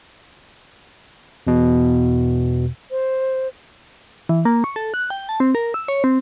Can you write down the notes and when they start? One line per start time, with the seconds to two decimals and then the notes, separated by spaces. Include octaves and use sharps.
1.47 E2 B2
2.91 C5
4.29 E3
4.45 A#3
4.64 C#6
4.76 A4
4.94 F#6
5.10 G5
5.29 A5
5.40 C4
5.55 A#4
5.74 E6
5.88 C#5
6.04 C4